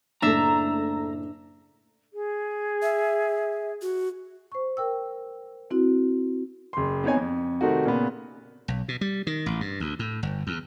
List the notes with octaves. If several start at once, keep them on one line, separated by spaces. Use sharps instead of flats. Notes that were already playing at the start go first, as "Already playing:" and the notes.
F#1 A2 D4 A4 E5 A#5
G#4
E5
F#4
C5 C#6
A#4 G5 E6
C4 E4 F#4
F#1 C6
B3 C4 D#4 C#5 G#5
F2
C3 D#3 A3 C4 D#4 F#4
A#2 C#3 B3
B1
B2
G3
D#3
A1
G2
D2
A2
G1
E2